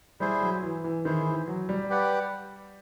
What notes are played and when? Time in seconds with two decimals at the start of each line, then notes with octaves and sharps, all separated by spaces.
0.20 G3 E4 G#4 C5
0.41 F#3
0.62 E3
0.84 E3
1.05 D#3 E4 G#4 C5
1.27 E3
1.48 F#3
1.69 G3
1.90 G4 B4 D5 F#5